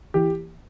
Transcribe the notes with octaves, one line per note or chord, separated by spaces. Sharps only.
E3 G4